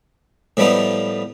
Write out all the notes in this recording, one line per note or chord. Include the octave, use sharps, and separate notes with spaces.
A2 F3 G3 A3 B3 D#4